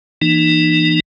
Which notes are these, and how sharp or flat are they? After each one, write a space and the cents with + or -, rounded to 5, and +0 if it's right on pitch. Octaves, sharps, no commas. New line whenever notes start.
E3 +10 A#3 +15 D#4 -30